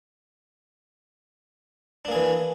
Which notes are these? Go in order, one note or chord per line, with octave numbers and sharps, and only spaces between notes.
E3 A#3 D4 G#4